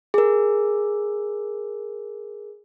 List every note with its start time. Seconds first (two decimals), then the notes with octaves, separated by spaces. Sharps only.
0.14 G#4 A#4